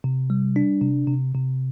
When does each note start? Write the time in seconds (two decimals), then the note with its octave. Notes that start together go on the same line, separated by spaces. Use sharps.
0.04 C3
0.30 G3
0.56 D4
0.81 C3
1.07 C3
1.35 C3